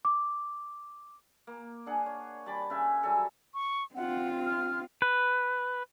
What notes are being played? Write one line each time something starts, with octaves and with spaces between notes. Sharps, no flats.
D6
A#3
D4 G#4 F#5
C#5
G3 A5 B5 D6
C#3 E5 G#5
F#3 G3 G#4 A4
C#6
C4 F4 F#5
F6
B4